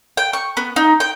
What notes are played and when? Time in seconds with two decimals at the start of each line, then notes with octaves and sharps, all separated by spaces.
0.17 G5
0.33 C#6
0.57 B3
0.76 D#4
1.00 G5